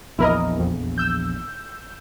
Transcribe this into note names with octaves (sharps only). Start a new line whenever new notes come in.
A#1 E2 E4 A#4 D#5
F2
E6 G6